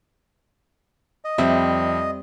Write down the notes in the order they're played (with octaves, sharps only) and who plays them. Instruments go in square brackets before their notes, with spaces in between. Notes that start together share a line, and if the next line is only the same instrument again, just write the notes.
[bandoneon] D#5
[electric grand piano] F2 [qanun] G3 C4 [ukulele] E5